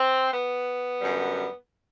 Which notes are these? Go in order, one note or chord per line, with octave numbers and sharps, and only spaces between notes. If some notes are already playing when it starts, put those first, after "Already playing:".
Already playing: C4
B3
F#2 D3 G3